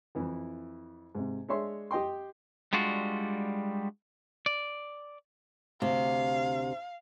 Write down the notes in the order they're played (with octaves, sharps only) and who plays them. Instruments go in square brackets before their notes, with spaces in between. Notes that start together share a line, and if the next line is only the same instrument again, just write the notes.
[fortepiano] F2 E3 E4
G#2 C3
G#3 D4 C#5 E5 C6
G4 D#5 G5 C6
[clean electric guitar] G3 G#3 D4 F4 F#4
D5
[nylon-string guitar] D2 C3 [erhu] F5